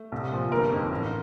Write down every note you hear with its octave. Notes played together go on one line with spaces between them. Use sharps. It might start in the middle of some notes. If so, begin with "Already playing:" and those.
Already playing: A3
C2
A#2 F3
G1 A#3 A#4
F2 D#3
A1